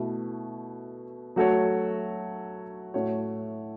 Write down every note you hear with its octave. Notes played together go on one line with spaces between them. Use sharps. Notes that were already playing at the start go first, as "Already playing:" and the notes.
Already playing: B2 A3 E4 B4
F#3 A3 F#4 A4 C#5
A2 A3 F#4 C#5